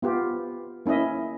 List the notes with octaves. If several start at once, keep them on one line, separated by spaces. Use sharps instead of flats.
B3 F4 G4
A#3 C#4 E4 D#5 E5